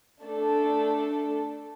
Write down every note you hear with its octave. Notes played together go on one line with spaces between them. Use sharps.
A3 D4 A4